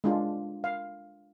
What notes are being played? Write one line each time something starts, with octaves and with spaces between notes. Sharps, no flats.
G#3 D4 F4
F5